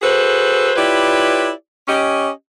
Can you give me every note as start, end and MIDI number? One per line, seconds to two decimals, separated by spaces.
0.02 0.71 66
0.02 0.71 68
0.02 0.71 69
0.02 0.71 71
0.02 0.71 72
0.76 1.50 64
0.76 1.50 65
0.76 1.50 67
0.76 1.50 71
0.76 1.50 73
0.76 1.50 74
1.88 2.29 61
1.88 2.29 67
1.88 2.29 75